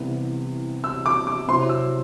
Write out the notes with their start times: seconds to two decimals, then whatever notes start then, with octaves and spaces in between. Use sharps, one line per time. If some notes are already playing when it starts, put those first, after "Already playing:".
Already playing: C2 C3 E3 B3 E4
0.84 E6
1.06 D6
1.27 D6
1.47 C3 F#3 C4 E4 C6
1.69 E6